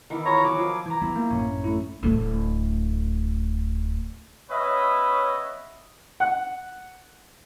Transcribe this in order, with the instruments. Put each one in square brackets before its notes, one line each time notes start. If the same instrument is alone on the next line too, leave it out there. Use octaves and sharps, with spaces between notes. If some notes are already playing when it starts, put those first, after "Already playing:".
[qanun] D#3 E3 [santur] B3 E4 D6
[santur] F4 G#4 [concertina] C#5 A#5
[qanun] F#3 [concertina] D6
[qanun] F3 [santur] A#4
[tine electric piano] E3 [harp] A#5 D6 G#6
[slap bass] E3 F3 G3 [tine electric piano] B3 [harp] E4
[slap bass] F3 [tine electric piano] A#3
[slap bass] A1 F#2 A2 [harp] C#4
[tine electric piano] A3 E4
[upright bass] D1 A3
[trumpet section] B3 C#4 B4 C#5 D#5 E5
[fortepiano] F#5